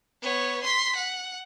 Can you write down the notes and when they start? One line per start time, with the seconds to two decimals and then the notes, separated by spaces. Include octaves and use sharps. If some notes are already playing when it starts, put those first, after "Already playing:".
0.22 B3 C#5
0.64 C6 B6
0.96 F#5